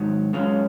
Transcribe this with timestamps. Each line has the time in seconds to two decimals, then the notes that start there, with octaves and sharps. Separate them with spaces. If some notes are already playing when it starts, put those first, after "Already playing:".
Already playing: G#2 D#3 F#3
0.33 F#2 C#3 G#3 C#4 F4